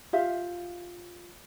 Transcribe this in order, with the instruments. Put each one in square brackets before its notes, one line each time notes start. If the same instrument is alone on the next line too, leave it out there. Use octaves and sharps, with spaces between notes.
[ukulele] F4 G4 E5 F5